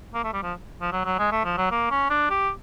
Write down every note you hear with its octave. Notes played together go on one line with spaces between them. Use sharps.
A#3
A3
G3
F3
F3
F#3
F#3
G#3
A3
F3
F#3
A#3
C#4
D4
G4